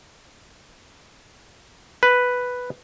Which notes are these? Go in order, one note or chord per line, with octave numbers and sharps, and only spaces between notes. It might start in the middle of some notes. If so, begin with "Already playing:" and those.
B4